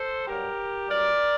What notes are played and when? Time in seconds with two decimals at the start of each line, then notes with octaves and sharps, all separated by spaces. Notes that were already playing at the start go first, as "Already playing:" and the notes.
Already playing: A4 C5
0.27 G2 F#3 G4 A#4
0.88 G2 F#3 A#4 D5